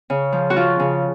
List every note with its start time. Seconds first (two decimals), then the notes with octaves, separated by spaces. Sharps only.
0.10 C#3
0.33 F3
0.50 F#4
0.56 F3 F4
0.79 C#3